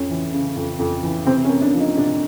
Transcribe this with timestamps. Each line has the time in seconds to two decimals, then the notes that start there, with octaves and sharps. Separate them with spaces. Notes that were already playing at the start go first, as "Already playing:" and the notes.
Already playing: F2 C#4
0.09 E3
0.33 C#3
0.56 F2
0.79 F2
1.03 E3
1.26 C3 C4
1.45 C#4
1.49 A#3
1.61 D4
1.74 F3
1.80 D#4
1.97 C3 D4